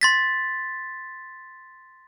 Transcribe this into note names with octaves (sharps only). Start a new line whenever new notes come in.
C6 A6 B6